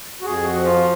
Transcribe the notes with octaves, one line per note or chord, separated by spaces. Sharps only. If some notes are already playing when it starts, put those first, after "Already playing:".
F#4
F2 G#4
F#4
F3
F4